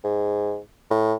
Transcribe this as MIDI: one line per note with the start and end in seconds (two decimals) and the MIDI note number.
0.04 0.59 44
0.90 1.14 45